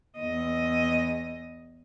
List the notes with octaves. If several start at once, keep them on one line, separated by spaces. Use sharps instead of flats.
E2 D#5